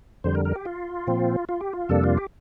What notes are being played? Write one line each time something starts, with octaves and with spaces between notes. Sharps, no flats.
F2 D3 G3 C5
A#4
A#4
G4
F4
A#2 F3 C4
F4
G4
F4
F2 C3 G3 A#3 D4 A4
F4
G4